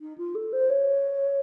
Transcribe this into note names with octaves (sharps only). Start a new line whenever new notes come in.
D#4
F4
A4
C5
C#5